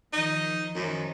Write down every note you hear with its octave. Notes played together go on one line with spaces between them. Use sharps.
D#3 F3 D#4
F#2 D#3 F3 D#4